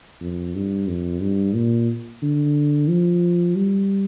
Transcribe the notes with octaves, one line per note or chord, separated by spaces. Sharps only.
F2
G2
F2
G2
A#2
D3
F3
G3